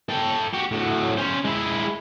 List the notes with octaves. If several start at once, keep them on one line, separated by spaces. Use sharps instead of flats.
A4 G5
F#4 G4
A2 F#3
C#4 C5
G#3 E4